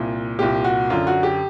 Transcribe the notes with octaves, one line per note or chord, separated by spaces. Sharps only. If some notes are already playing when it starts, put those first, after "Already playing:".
Already playing: C2 A#2
C2 A#2 G4
F#4
F#2 D3 F4
F#4
G4